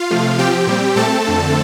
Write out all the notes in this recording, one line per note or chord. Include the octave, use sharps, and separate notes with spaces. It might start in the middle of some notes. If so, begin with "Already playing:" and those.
Already playing: F4 F5
C3 F3 A3
C3 F3 C4 G4 G5
A#2 G3 C4
A#2 A3 C4 A4 A5
F2 D3 A3 C4